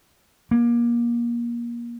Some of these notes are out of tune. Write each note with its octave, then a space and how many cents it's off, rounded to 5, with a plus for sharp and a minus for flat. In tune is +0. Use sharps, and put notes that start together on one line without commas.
A#3 +25